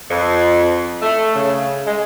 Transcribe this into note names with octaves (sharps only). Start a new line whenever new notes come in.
F2
A3
C#3
G#3